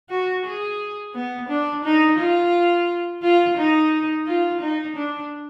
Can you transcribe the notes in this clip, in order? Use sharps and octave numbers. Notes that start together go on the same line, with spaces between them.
F#4
G#4
B3
D4
D#4
F4
F4
D#4
F4
D#4
D4